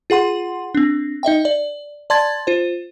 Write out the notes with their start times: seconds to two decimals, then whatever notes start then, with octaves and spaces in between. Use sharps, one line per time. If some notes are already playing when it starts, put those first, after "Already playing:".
0.10 F4 G#4 F#5 C6
0.75 C4 D4
1.23 D#4 D#5 E5 G5
1.45 D5
2.10 D5 A5 C6 G#6 A6
2.47 F4 C5